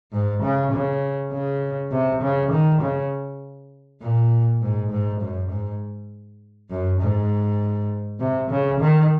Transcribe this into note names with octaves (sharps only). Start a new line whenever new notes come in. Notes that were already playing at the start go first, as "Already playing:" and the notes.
G#2
C#3
C#3
C#3
C3
C#3
D#3
C#3
A#2
G#2
G#2
F#2
G#2
F#2
G#2
C3
C#3
D#3